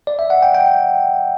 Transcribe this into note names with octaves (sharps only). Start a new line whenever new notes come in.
D5
E5
F#5
G5
G5